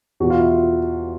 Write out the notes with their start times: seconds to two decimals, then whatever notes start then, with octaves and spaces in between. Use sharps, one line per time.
0.20 E2 B2 F#4
0.30 F4
0.39 E4
0.49 F4